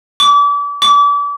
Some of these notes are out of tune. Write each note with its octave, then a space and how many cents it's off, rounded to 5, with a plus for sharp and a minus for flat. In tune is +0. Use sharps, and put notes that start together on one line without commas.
D6 -35
D6 -35